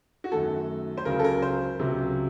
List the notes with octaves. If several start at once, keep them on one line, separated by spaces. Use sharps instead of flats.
F#4
F#2 D#3 A3 A4
C5
C#2 C#3 F#3 A#4
A4
A#4
C5
C#2 C3 F#3